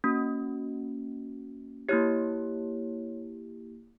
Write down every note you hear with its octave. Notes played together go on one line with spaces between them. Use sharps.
A#3 C#4 F#4
A#3 E4 G4 C#5